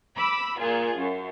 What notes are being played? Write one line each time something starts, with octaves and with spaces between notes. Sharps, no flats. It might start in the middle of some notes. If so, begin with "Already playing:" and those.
B5 D6 E6
A#2 F4 G#4
F#2